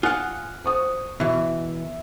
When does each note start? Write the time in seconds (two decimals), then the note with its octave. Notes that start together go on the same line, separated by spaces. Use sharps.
0.03 F4 F#5 G#5 D#6 F#6
0.64 C5 C#6 D#6
1.20 B2 E3 E5